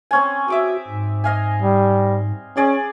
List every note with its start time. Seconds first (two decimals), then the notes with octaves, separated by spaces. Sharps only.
0.11 C4 C#4 G#5
0.48 F#4 E5 D6 D#6
0.87 G#2
1.24 D#5 F5 G#5
1.62 G3
2.57 C#4 G#4 D5 G#5